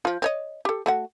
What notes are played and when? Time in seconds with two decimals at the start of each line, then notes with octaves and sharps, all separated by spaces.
0.05 F3 F4
0.22 C4 C#5 D#5
0.65 G4 A4
0.86 A3 F#4 F#5